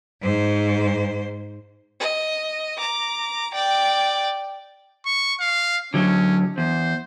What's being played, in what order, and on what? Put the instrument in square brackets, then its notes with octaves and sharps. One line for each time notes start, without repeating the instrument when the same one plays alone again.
[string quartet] G#2 C5
[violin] D#5
A#5 D6
D5 G5
[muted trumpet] C#6
F5
[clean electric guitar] D3 F#3 [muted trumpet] C#4
[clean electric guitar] E2 [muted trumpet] C5